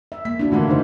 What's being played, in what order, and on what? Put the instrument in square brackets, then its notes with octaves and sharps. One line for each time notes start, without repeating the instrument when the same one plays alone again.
[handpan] E5
[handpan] A#3 [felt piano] B6
[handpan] D4 E4 F#4
[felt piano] D3 E3 A#3 [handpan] A3 F4
[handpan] C#3 D#4 C5